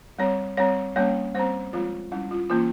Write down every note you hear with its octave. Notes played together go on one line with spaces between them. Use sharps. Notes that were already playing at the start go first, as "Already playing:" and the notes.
G3 C4 C#5
G3 C4 C#5
G3 A#3 C#4 C#5
G3 C4 C5
F3 G#3 C4 F4
G3 C#4 E4
F4
E3 A#3 C#4 F4